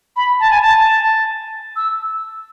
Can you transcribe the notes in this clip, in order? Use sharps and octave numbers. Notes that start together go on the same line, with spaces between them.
B5
A5
G#5
A5
E6